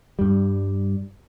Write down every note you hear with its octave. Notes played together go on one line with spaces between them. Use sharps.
G2 G3